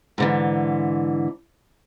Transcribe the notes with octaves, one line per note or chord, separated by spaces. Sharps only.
G#2 D3 E3